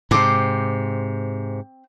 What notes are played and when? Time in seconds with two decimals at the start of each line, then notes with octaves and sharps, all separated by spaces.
0.11 G#2 C3 C4 C6 D6